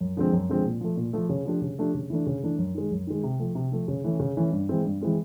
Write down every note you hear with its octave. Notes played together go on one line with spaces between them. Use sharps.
F#2
D3 F3 G#3 C4
F#2
D3 F3 G#3 C4
A#2
F3 A3
A#2
F3 A3
C#3
F3 A3 D4 G4
C#3
F3 A3 D4 G4
C#3
E3 A3 D4
C#3
E3 A3 D4
F#2
D#3 G#3
F#2
D#3 G#3
C3
F3 A3
C3
F3 A3
C#3
E3 A3 C#4
C#3
E3 A3 C#4
G2
E3 G#3 C4
G2
E3 G#3 C4